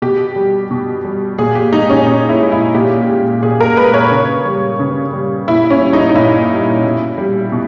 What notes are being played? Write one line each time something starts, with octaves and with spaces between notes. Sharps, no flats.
B2 G4
G3
B2
G3
A#2 G#4
G4
G#3 D#4
C#4
A#2 D#4
E4
G#3
E4
A#2 G4
G#3
A#2 G#4
A#4
G#3 B4
C#5
C#3
G3
C#3
G3
A#2 E4
C#4
G3
D#4
D#4
A#2 E4
G3
B2
G3
B2